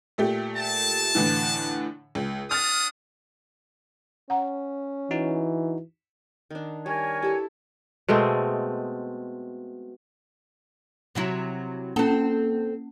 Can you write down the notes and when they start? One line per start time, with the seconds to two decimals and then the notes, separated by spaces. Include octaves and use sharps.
0.18 A#2 A3 G4
0.57 A5
1.15 A2 D3 E3
2.15 C#2
2.51 D4 F#5 D#6 F6 A6
4.30 C#4 F#5 A#5
5.11 E3 D#4 F#4
6.51 D#3 D4
6.86 G3 A#4 C#5 G#5
7.23 E4 G4 A4
8.09 B2 G#3 A3 C4
11.15 C3 F#3 E4
11.96 A#3 C4 C#4 A4